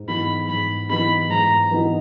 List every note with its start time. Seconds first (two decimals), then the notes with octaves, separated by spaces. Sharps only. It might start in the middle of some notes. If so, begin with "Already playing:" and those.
Already playing: G#2
0.08 E3 B3 D#4 B5
0.48 G#2 B5
0.89 E3 B3 D#4 B5
1.30 G#2 A#5
1.71 E3 B3 D#4